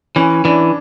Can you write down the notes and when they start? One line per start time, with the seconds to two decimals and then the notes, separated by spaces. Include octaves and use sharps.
0.16 E3 C#4
0.45 E3 D4